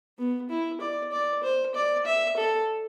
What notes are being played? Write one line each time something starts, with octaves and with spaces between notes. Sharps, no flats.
B3
E4
D5
D5
C5
D5
E5
A4